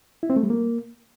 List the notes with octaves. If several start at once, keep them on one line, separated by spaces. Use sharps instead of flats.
E4
C4
A3
G3
A#3